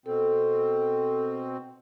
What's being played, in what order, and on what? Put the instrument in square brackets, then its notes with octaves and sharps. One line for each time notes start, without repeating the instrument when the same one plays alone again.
[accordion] B2 C4 [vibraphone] A4